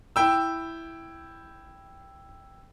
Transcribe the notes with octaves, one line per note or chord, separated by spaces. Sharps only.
E4 G5 E6